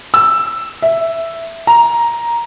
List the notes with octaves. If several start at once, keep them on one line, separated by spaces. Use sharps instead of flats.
E6
E5
A#5